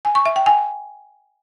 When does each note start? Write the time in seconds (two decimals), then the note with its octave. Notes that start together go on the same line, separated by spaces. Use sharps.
0.05 G#5
0.15 C#6
0.26 E5
0.36 G5
0.46 G#5